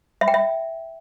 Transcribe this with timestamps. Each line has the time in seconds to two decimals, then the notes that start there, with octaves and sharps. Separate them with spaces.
0.21 E5
0.28 G5
0.34 E5